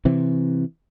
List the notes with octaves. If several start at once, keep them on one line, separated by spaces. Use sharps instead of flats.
C3 E3 C4